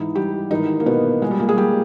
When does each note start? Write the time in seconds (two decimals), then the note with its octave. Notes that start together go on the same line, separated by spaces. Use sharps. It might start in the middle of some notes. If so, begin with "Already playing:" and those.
Already playing: G#2 E3 D#4
0.15 G3 G4
0.50 G#2 D#3 E3 D#4
0.80 A#3
0.86 B2 B3
1.22 A#2 G#3
1.31 G3
1.40 A#2 A#3
1.49 G#3 G#4
1.57 G3 G4